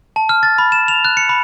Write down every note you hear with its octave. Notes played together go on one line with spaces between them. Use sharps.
A5
F6
A6
B5
E7
F7
F#6
C#7
B5